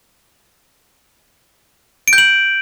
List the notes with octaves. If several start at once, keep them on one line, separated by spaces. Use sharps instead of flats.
D7
G6
F#7